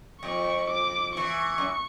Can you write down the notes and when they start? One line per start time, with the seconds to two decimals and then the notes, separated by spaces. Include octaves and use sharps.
0.22 F2 C#6
0.70 D6
1.17 E3 C#6
1.58 F#2